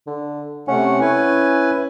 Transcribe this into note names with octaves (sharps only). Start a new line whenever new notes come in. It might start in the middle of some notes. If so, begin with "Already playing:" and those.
D3
C3 A3 C#4 F#5
C#4 E4 B4 G#5